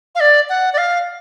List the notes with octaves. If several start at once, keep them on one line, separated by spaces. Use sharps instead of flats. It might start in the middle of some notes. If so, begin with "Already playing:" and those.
F5
D5
F#5
D5
F5